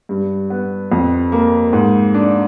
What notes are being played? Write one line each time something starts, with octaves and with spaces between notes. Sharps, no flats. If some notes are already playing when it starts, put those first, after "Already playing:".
G2
B3
F2
A#3
G#2
D4